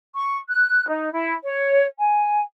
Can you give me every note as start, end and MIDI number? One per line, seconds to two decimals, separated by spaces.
0.15 0.37 85
0.49 0.86 90
0.88 1.11 63
1.12 1.33 64
1.43 1.86 73
1.98 2.42 80